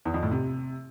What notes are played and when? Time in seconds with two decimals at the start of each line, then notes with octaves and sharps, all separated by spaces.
0.05 E2
0.14 F2
0.23 A2
0.31 C3